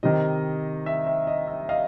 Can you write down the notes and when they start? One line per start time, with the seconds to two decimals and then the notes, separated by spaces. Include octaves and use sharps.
0.03 C3 D#3 D#5
0.86 E5
1.07 E5
1.27 D#5
1.48 E5
1.69 D#5 F5